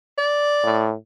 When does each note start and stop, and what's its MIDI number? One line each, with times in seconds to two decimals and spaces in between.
0.18 0.87 74
0.63 0.94 45